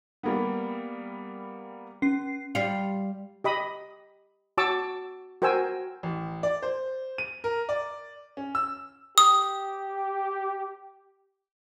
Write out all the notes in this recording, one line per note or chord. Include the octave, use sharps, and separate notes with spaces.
G3 A#3 B3
C#4 C7
G3 F4
G4 D#5 B5 D#6
F#4 C#5 A5 C#6 D6 E6
F#4 A#4 C5 G5 G#5 E6
A1
D5
C5
D#7
A#4
D5
C#4
E6
G4 D#6